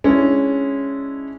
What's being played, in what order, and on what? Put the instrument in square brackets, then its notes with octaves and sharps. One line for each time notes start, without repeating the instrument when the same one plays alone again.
[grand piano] G#3 C#4 D4 E4